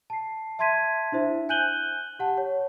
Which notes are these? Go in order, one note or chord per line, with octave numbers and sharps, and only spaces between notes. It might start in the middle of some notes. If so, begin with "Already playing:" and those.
A5 C7
E5 A5 C6 G#6 B6 D#7
D4 E4 C5 E5
G#5 F#6 G6 D#7 F#7 G7
G4 F#5 A5
C#5